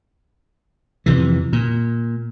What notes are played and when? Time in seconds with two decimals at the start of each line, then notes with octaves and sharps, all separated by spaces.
1.06 F2 C3 E3
1.53 A#2